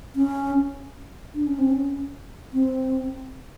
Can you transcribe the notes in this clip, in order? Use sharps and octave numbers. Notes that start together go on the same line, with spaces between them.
C#4
D4
C#4
C4
C#4
C4